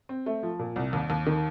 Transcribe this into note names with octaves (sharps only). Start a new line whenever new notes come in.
C4
A3
F3
A#2
C2
D#2
D#2
D#3